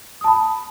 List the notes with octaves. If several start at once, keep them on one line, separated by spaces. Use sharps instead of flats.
A5 B5 D#6